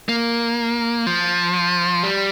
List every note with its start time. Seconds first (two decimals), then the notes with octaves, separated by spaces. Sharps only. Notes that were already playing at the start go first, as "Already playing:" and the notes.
0.09 A#3
1.06 F3
2.03 G3